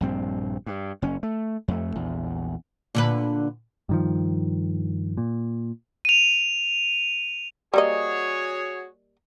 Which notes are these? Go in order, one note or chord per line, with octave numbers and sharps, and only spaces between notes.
A#1 G2 C4
G2
F#1 C#4
A3
F2 A3
A#1 E2
A#2 D3 B4
G2 D#3 F3
A#2
D#7 F7
G3 A#3 F#4 G#4 C#5 D#5